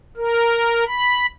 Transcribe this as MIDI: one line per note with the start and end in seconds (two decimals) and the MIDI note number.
0.17 0.84 70
0.87 1.26 83